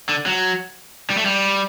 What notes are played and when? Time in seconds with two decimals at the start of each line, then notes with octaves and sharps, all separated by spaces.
0.09 D3
0.26 F#3
1.10 G3
1.18 A3
1.25 G3